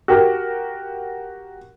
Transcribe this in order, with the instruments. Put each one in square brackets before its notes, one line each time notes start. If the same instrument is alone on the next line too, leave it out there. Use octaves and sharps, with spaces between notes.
[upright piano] F#4 G4 A#4